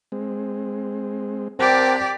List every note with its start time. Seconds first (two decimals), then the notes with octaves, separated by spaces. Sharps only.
0.12 G#3 C4
1.59 C4 G4 A#4 D5 F#5 A5